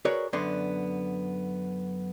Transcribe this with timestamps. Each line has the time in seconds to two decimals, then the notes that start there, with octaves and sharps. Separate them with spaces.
0.05 F#4 G#4 A#4 B4 C#5 D5
0.33 F#2 D3 B3 D5 C6